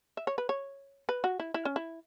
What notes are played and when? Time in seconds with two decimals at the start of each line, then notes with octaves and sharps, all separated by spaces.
0.17 E5
0.27 C#5
0.38 B4
0.49 C#5
1.09 B4
1.24 F#4
1.40 E4
1.54 E4
1.65 C#4
1.76 E4